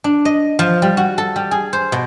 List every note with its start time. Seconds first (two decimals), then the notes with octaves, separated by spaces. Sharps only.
0.04 D4
0.25 D#5
0.59 F3
0.82 G3
0.97 F#4
1.18 A4
1.36 G3
1.51 G#4
1.73 C5
1.92 B2